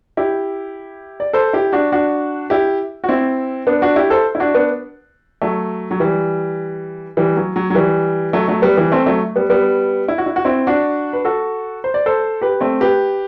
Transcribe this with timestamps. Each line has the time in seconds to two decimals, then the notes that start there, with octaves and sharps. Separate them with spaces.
0.17 E4 G4
1.20 D5
1.33 A4 C5
1.53 E4 G4
1.73 D4 F#4
1.92 D4 F#4
2.50 E4 G4
3.04 F#4
3.09 C4 E4
3.67 B3 D4
3.82 D4 F#4
3.96 E4 G4
4.10 A4 C5
4.35 E4
4.40 D4 F#4
4.54 B3 D4
5.42 F#3 A3
5.91 F#3
6.00 E3 G3
7.17 E3 G3
7.37 F#3
7.56 F#3
7.70 F#3
7.75 E3 G3
8.33 F#3 A3
8.48 F#3 A3
8.62 G3 B3
8.77 E3 G3
8.92 A3 C4
9.06 F#3 A3
9.36 G3 B3
9.50 G3 B3
10.08 E4
10.18 F#4
10.26 E4
10.36 F#4
10.45 C4 E4
10.67 D4 F#4
11.13 B4
11.25 F#4 A4
11.84 C5
11.94 D5
12.06 A4 C5
12.41 G4 B4
12.61 A3 C4
12.81 G4 B4